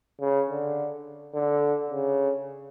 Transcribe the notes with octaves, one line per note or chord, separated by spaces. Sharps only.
C#3
D3
D3
C#3